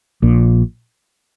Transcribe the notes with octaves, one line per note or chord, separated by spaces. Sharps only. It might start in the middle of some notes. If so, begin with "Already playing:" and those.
A#1 A#2